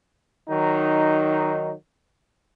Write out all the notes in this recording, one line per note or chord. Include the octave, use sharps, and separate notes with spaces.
D#3 F#3 D#4